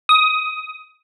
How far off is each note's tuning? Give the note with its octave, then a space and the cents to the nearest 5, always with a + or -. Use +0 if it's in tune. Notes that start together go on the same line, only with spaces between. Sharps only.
D#6 +15